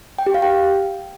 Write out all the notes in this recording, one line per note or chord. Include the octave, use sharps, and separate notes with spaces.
G5
G4
F5
G5